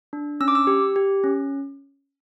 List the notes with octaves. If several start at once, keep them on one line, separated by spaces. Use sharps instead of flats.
D4
C#4 E6
D6
E6
G4
G4
C#4